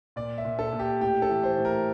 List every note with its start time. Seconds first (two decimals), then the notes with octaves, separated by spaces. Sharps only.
0.16 A#2 D5
0.38 E5
0.45 A#2
0.59 A4
0.73 A#2
0.79 G4
1.01 A2 G4
1.22 A4
1.29 E3
1.43 C5
1.57 A2
1.65 A#4